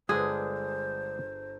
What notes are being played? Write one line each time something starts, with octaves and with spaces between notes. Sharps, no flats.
G1 D3 G#3 D4 G#4 C5